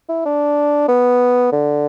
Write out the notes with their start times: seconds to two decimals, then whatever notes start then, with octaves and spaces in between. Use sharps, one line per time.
0.09 E4
0.26 D4
0.88 B3
1.52 D3